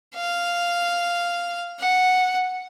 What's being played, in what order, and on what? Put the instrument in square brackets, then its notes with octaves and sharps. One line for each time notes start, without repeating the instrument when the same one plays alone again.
[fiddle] F5
F#5